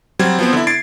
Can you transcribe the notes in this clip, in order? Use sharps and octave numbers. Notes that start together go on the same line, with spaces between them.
F#3 G3 C4 G#6
F3 B3 C4
D3 E4
G#6 A6 C7 D7